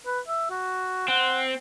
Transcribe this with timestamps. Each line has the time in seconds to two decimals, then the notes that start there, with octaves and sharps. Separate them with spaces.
0.06 B4
0.28 E5
0.50 F#4
1.08 C4 F#5